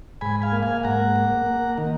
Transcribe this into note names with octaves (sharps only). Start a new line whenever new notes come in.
G#2 G#5 B5
F5 G#5
A#3
F5 G#5
G#2 F#5 A#5
A#3
A#3
D#3